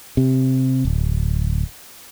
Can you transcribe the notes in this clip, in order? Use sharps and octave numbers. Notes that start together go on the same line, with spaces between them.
C3
D1